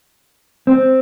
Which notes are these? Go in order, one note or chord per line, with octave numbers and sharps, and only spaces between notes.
C4